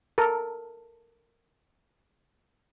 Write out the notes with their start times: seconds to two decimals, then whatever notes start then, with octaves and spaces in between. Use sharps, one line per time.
0.18 A4 A#4